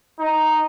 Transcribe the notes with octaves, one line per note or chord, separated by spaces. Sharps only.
D#4